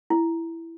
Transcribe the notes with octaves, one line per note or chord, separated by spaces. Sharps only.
E4